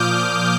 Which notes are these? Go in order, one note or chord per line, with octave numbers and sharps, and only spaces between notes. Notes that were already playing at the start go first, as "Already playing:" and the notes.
Already playing: A#2 F3 D6 D#6 F6 G6